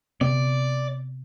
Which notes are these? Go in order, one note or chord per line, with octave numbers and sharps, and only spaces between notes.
C3 B3 C4 D5